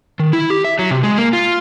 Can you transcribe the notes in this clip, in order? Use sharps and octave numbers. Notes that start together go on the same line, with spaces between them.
D#3
E4
G4
E5
F#3
C3
G#3
A#3
F4